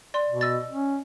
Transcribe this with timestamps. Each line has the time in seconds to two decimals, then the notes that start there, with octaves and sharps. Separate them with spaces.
0.14 D5 C6
0.29 B2
0.41 D#5 E6 A6
0.70 C#4